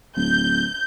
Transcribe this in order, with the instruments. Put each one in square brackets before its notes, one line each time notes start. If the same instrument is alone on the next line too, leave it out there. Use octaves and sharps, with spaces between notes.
[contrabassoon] D1 [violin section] G6